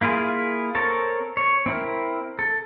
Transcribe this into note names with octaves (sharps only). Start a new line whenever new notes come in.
A#3 E4 F4 G#4
C4 A4 A#4 C#5 A5
C#5
C4 E4 A#4
A4